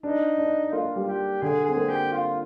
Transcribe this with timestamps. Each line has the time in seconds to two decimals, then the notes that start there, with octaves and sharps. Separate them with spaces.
0.03 D4 D#4
0.38 D4
0.72 A#3 F4
0.96 G3
1.07 G4
1.42 D3 G#4
1.65 C4 G#4
1.77 A#3
1.89 G4
2.12 F4